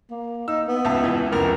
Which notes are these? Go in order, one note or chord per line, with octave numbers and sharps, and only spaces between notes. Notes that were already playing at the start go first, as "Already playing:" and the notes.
A#3
D#4 E6
B3
C#2 E5 A5
C#2 E3
F1 C#2 A#4